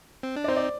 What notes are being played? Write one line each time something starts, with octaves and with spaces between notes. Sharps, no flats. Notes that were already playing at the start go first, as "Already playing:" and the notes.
C4
D4
D5
C4 D#4 C5
D5